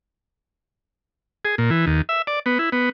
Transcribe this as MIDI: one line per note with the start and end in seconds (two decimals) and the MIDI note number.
1.45 1.55 68
1.58 1.70 46
1.70 1.86 52
1.87 2.02 39
2.09 2.22 76
2.27 2.39 74
2.46 2.58 59
2.59 2.70 64
2.72 2.89 59